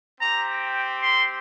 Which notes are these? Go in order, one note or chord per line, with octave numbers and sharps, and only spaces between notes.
C4 G4 A#5
C6